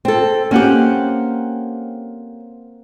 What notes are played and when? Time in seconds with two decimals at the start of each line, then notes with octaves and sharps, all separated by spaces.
0.05 C4 A4
0.51 A#3 C4 C#4 G4 F#5